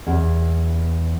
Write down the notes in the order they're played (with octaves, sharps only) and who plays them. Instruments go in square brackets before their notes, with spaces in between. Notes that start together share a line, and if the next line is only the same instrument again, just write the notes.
[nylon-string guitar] E2